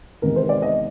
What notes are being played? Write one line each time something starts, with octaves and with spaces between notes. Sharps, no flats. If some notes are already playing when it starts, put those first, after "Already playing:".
E2 C3 D#3 G#3 B3 A#4
C5
D5
D#5